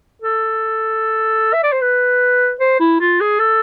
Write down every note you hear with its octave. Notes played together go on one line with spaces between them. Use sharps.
A4
E5
D5
C5
B4
C5
E4
F4
G#4
A4